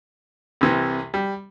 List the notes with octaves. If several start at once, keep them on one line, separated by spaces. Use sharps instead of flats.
C2 C3 E3
G3